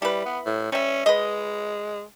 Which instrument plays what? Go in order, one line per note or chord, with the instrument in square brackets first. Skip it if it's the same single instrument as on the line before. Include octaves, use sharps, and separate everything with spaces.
[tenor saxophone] G3 [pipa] E4 B4
[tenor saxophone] B3
A2
[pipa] G3 E5 [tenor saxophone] C#4
[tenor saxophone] G#3 [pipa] B4 D#5